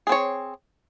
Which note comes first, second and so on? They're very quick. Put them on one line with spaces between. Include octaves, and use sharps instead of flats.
G#4 C4 C#5